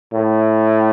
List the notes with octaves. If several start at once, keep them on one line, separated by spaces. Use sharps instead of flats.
A2